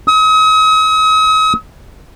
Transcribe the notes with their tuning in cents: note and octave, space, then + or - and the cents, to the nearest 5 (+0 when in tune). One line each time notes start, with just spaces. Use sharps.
D#6 +40